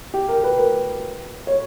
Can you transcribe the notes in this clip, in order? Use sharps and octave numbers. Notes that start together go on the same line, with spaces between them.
G4
A#4
B4
A#4
C#5